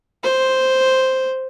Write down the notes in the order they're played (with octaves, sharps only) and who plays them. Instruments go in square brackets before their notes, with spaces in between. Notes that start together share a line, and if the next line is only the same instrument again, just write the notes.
[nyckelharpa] C5